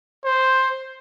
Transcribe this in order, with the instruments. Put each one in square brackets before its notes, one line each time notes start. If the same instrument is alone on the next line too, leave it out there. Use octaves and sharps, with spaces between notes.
[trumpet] C5